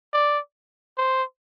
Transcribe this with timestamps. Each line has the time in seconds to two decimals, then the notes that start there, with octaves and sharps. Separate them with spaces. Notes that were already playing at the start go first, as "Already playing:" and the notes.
0.13 D5
0.97 C5